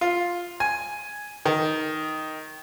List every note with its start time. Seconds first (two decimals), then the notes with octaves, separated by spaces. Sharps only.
0.01 F4
0.60 G#5
1.46 D#3